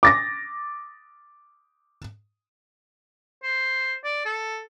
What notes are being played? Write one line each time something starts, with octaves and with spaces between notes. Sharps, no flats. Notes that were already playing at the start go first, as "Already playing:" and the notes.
D6 A6 A#6
C5
D5
A4